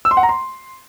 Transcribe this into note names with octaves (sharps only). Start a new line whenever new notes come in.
E6
C6
F#5
A#5
C6